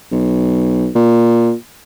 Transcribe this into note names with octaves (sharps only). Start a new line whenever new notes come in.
B1
A#2